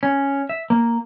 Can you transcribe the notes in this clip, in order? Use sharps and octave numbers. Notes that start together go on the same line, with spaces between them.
C#4
E5
A#3